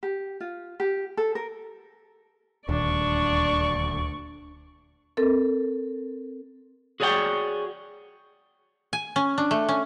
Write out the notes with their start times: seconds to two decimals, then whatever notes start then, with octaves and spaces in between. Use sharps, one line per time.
0.03 G4
0.40 F4
0.80 G4
1.17 A4
1.35 A#4
2.69 D#1 D2 D4 D5 C#6
5.17 C4 A4 A#4
7.00 F#4 G#4 C#5 D5 F#5 G5
8.93 G#5
9.16 C#4
9.38 D4
9.51 A3
9.69 C#4